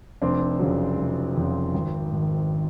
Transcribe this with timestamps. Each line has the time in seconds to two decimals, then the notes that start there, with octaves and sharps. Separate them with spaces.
0.22 F1 C4 D4
0.60 F2 C#3 F#3
0.97 F1
1.36 F2 C#3 F#3
1.74 G#1
2.11 G#2 D#3